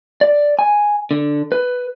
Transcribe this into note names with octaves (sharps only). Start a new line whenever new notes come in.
D5
G#5
D3
B4